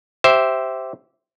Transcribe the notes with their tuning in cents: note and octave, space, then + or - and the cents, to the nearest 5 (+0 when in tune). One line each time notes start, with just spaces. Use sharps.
G4 -15 C5 +0 E5 +0